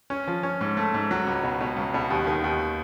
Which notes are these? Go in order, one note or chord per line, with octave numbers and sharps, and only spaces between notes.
C#4
F3
C#4
G#2
A3
G#2
F#3
C#2
B2
B2
C#2
B2
D#2
D#3
D#2